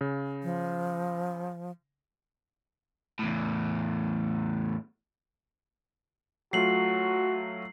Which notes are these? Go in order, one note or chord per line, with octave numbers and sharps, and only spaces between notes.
C#3
F3
E2 A2
F#3 A3 F4 F#4 C7 F#7